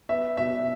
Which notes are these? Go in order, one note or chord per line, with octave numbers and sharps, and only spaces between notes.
B3 E5
B2 E5